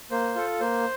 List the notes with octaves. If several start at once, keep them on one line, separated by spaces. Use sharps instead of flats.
A#3 C5
F4 A4
A#3 C5